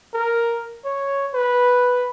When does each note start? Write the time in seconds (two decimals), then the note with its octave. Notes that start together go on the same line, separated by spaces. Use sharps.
0.14 A#4
0.85 C#5
1.34 B4